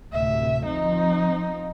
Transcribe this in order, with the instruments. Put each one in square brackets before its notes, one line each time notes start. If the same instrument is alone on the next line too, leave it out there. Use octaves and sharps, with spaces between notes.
[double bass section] D2 A2 C3 [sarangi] E5
[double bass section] F3 C4 [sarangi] D#4